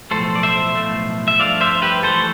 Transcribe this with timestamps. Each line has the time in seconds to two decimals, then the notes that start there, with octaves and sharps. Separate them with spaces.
0.11 B1 A2 F3 A3 A4 C5
0.35 D5
0.43 C5 E5
0.75 B1 A2 F3 A3
1.28 E5
1.39 G2 F3 A3 D5 F5
1.61 C5 E5
1.82 G4 B4
2.03 F2 E3 A3 A4 C5